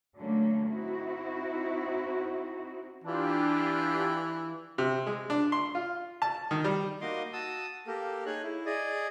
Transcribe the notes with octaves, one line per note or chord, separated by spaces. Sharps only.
D3 F#3 A3 A#3 C#4
C4 D#4 E4 F#4
E3 D4 F4 G4
C3
G#3
D4
C6
F4
A5
D#3
G3
A#3 D#4 F#4 D#5 C6 D6
F#4 A5 D#6 E6
A#3 G4 A4 A#4
D#4 G#4 C#5 F#6
E4
G#4 D5 D#5